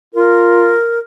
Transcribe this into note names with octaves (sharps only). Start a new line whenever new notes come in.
F4 A#4